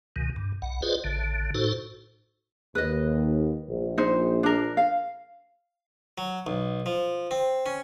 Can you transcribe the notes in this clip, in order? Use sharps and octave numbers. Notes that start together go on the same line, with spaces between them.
C#2 B2 D#3
G2
B1 F#5
F4 G#4 B4 C5 D5 D#5
A1 D3
A2 D#4 F#4 A4 C5
D#2 B4 D#5
A#1
D#4 C5
D4 A#4
F5
F#3
B1
F3
C4
C#4